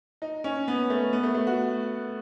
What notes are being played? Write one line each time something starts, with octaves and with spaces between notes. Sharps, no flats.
D#4
C#4
B3
A3
B3
A3
A3
F#4